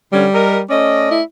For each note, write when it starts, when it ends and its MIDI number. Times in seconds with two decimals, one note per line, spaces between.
0.12 0.26 50
0.12 0.64 55
0.12 0.26 61
0.34 0.58 70
0.34 0.58 75
0.70 1.18 57
0.70 1.11 61
0.70 1.18 74
0.70 1.18 75
1.11 1.23 64